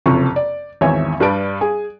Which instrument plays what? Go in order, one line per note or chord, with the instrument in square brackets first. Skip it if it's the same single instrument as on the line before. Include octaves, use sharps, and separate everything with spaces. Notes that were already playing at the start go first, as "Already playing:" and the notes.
[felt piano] F#1 F2 C3 C#6
D5
G#1 E2 C#5 E5 G#5
G2 G3 B4 A5 D7
G#4